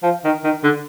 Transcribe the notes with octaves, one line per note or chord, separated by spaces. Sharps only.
F3
D#3
D#3
D3